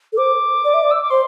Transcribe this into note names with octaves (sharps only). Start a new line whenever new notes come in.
A4
C5 D6
D5
E5
D5
E6
D6
C5 C6